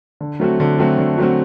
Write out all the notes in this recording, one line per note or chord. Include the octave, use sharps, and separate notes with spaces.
D3
F#3 A3 C4 F#4
D3
F#3 A3 C4 F#4
D3
F#3 A3 C4 F#4